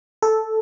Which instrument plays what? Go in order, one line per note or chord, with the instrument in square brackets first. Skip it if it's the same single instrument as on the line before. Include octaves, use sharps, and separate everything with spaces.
[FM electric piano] A4